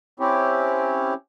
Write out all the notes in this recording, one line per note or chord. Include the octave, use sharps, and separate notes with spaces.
C4 C#4 E4 G4